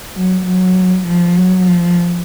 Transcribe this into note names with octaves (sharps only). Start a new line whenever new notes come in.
F#3
F#3
F3
F#3
F3